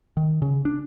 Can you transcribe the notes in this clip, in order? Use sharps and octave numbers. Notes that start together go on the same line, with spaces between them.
D#3
C#3
D4